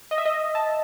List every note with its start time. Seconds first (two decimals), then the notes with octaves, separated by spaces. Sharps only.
0.11 D#5
0.18 E5
0.25 D#5
0.55 A5